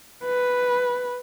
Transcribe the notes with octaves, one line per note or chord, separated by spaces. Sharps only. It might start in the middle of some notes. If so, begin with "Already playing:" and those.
B4